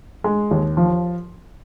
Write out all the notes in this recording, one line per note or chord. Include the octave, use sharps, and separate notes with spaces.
G#3
D#2
F3